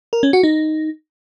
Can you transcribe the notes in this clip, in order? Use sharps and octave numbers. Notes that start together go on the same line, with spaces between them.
A#4
C#4
F#4
D#4